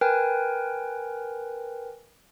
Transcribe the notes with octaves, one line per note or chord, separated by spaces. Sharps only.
A#4 B4 G5 G#5